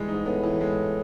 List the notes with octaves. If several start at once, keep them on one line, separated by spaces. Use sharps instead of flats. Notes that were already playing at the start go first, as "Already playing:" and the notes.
Already playing: E3 G3 G#3
G#2 D#4
A2 B3
E3
G#3